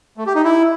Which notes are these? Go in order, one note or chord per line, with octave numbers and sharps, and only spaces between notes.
A3
G4
D#4
E4